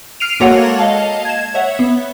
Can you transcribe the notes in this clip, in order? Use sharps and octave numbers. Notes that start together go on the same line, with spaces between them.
F6 C7 D7 D#7 F7
G#3 A#3 F#4 A4 C#5 F#5
D#5 F5 A5
G#6 E7
C#5 E5 F#5
B3